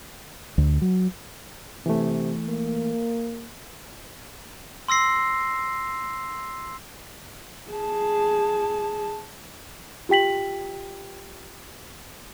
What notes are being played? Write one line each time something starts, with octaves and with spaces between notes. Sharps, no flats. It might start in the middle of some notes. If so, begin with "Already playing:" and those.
D2
F#3
C3 E3 A3
A#3
C6 E6 A#6 C7
G#4 A5
F4 G4 G5 B6 F#7